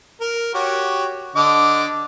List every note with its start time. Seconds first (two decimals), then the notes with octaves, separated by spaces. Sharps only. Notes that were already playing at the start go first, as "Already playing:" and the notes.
0.21 A#4
0.54 F#4 G4 C#5
1.36 D3 D#5 D6